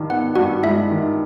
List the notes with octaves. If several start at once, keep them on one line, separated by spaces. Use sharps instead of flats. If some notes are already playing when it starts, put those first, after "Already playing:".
Already playing: G2 D#3
B3 F#5
G2 F#4 F#5
G#3 E4 E5
D#3